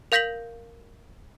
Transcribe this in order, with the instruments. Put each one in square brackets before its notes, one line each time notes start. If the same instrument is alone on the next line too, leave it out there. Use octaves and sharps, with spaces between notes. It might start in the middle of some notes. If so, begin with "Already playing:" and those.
[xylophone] A#4 F5 G6 A#6 B6 F#7